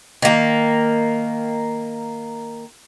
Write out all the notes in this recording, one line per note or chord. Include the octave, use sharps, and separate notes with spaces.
D#3 A#3